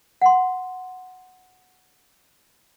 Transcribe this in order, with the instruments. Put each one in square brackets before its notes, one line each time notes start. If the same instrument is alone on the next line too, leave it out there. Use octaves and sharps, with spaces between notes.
[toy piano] F#5 C6